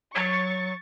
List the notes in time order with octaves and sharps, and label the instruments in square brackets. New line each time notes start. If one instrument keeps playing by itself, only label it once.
[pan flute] F#3 [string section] C#6 A6